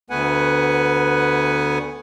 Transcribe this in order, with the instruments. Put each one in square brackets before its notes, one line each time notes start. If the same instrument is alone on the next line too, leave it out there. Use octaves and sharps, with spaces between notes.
[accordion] D2 A3 B3 B4 F#5 G#5